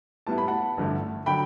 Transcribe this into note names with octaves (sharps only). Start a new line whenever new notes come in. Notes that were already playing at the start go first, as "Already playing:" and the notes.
A2 G3 B3 E4 A5
B5
F#5 A5
A1 G2 D3 A3 E4
D3 F#3 G5 B5